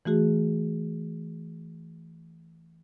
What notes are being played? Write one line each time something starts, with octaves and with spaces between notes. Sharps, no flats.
E3 A3 F#4 G#4